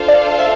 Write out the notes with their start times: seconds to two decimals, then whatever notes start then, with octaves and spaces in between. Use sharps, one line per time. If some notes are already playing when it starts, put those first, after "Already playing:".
Already playing: D4 F4 A4 C5 F5
0.08 D5
0.39 E5